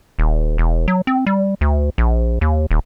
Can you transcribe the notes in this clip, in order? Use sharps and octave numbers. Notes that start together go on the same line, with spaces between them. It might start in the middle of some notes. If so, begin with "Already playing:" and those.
D#1
E1
F#3
C4
G3
D2
A#1
D#2
D#1